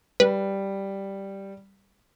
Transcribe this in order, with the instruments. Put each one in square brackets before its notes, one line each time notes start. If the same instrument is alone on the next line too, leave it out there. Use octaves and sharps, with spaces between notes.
[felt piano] G3 [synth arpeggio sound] B4